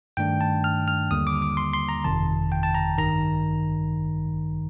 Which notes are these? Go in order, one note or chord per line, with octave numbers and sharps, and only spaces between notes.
G2 D#3 A3 D4 G5
A5
F6
F6
D#2 D3 G3 A#3 D#6
D6
D6
C6
C6
A#5
G1 F2 C3 D#3 A5
G5
A5
A#5
A1 G2 D#3 A#5